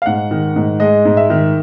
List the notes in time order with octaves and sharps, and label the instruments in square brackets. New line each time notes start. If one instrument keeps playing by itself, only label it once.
[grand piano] F5
G#2 F#5
D#3
G#2
G#3 D#5
G#2
E5
D#3